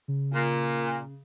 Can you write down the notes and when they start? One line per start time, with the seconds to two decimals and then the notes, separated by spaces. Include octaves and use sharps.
0.08 C#3
0.34 A#2